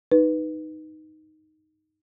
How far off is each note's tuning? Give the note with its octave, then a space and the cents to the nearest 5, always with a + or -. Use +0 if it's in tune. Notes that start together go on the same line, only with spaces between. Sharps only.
D#4 +0 B4 +0